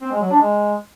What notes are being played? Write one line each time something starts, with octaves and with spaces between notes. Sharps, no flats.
C4
G#3
F#3
D4
G#3